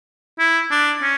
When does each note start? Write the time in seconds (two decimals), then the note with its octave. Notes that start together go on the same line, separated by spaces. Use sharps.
0.39 E4
0.71 D4
1.02 C#4